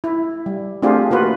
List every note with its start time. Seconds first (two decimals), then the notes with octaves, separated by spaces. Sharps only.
0.04 E4
0.46 G3
0.82 A3 C4 D4 F4 G4 G#4
1.11 A#3 F4 F#4 B4